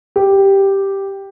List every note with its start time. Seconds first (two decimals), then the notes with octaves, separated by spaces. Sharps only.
0.16 G4